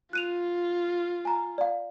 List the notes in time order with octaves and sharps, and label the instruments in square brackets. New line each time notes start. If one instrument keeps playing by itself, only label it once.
[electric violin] F4 [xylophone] F#6 D#7 F7
[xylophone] G#5 A#5
D5 F5